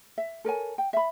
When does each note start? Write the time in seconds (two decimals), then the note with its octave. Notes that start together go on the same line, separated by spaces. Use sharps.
0.18 E5
0.45 A4 A#4 C#5 G#5
0.78 G5
0.93 E5 B5